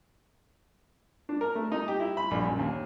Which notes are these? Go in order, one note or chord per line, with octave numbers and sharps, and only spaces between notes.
D4
A#4
A3
D#4
G4
E4
B5
A#1
F#2
D#2